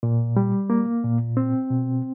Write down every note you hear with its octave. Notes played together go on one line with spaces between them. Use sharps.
A#2
G3
A#3
A#2
C4
B2